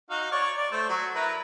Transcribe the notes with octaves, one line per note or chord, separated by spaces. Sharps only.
D#4 F#4 F5
C#5 D5 C#6
D5
A3 C5
F#3 F#4
E4 A#4 B4